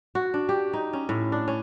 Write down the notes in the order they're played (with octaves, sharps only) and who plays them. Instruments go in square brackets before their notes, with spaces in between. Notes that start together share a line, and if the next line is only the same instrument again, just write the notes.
[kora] F#4
D4
G4
D#4
C#4
A2
D4
C#4